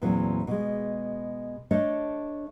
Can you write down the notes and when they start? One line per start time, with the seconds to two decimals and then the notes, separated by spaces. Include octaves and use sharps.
0.02 E2 A#2 E3 F#3 C4
0.47 B2 G#3
1.71 A3 D4 A4 C#5 D#5